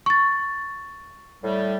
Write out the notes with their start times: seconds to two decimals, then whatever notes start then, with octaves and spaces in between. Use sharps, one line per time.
0.06 C#6 A6
1.44 A2 G3